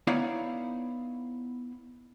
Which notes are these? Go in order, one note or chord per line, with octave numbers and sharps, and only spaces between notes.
B3 D#4 E4 C#5 D5 F5